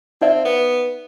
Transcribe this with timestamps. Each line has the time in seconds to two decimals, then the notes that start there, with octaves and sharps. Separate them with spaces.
0.21 C4 D#4 D5 E5
0.45 B3